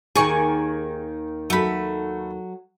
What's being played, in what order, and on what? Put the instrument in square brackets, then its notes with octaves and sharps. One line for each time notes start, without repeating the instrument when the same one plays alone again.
[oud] D#2 D#3 [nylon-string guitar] G#4 A#4 [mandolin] G#5 C#6
[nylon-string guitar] F#3 A4 [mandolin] A3 B5